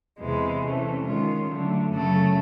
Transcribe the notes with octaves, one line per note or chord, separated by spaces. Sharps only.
E2 C3 E3 G#3
C3 E3 A3 C#4
D#3 G#3 C#4 F4
D3 F#3 A3
F#2 C#3 F#3 A3